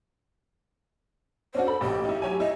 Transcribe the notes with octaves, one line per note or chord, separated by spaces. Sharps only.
C#4 D4 F#4 C5
A4 B5
A1 A#2 G4
D#4 E4
F#3 G4 C#5 G#5
E4 D#5